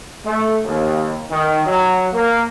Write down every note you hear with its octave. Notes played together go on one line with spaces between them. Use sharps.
A3
D#2
D#3
F#3
A#3